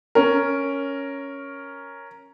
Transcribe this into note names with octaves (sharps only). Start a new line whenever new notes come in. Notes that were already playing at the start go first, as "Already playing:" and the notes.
C#4 A#4